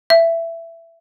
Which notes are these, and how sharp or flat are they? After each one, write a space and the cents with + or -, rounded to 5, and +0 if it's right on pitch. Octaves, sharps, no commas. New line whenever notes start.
E5 +15